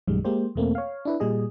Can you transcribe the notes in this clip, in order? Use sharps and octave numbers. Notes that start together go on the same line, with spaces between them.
A#1 F#2 D#3 G3 G#3
G#3 A#3 G4 C5
E2 B2 A3 A#3 C4
C#5 F5
D4 E4 B4
A#2 G3 G#4 D#5